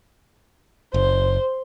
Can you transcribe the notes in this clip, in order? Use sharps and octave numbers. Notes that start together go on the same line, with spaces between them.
F#1 C5